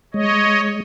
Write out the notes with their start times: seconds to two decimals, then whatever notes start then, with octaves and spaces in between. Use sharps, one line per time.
0.14 G#3 C#5 D#5